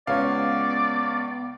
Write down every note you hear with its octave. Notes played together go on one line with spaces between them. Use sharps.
C#2 B3 C#5 D5 F5